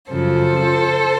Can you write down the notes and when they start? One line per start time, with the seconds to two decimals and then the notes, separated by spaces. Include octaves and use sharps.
0.10 F#2 C#3 F3 A4 C5